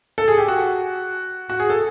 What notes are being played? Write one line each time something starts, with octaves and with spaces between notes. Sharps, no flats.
A4
G#4
G4
F#4
F#4
G#4
A4